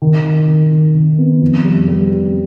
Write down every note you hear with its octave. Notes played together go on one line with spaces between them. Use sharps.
D#3
D#3
D#3
D#3
D#3
B3
F2
G3
G3
G3